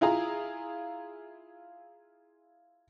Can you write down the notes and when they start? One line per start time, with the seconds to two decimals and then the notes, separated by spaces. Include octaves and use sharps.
0.01 E4 F4 G#4 A#5